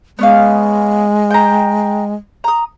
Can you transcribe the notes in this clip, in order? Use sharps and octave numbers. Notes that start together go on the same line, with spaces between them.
G#3 B3 C#4 F5
G5 A#5
A#5 D#6